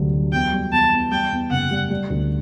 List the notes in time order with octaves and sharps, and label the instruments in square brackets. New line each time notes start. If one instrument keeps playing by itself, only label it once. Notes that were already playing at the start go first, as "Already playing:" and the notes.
Already playing: [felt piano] D2 D3 F#3 G3
F#3
[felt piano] E2 [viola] G5
[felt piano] G3
[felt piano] E2 [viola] A5
[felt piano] E2
[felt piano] G3 [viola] G5
[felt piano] E2
[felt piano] F#1 [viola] F#5
[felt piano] G3
G3
D2